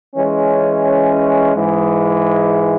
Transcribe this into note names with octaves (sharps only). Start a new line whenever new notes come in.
E3 G#3 C#4
G#2 E3 G#3